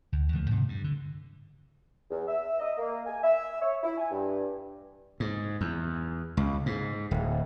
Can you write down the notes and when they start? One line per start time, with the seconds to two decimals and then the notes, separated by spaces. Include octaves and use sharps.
0.12 D2
0.33 E2 D3 F3 A3
0.50 G#2 C3 D#3
0.68 G2
0.84 D3
2.10 E2
2.27 E5
2.60 D#5
2.77 A#3
3.06 G#5
3.23 E5
3.62 C#5
3.83 E4
3.98 G#5
4.11 G2
5.20 G#2
5.61 E2
6.37 C#2
6.66 G#2
7.11 D1